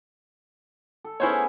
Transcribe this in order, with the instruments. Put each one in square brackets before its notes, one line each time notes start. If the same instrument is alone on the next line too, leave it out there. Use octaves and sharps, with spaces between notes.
[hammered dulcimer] A4
[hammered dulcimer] B3 C#4 G#4 [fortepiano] E4 C5 C#5